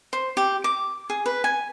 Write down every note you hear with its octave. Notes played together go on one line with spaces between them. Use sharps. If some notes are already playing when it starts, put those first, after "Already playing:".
C5
G4
D6
G#4
B4
G#5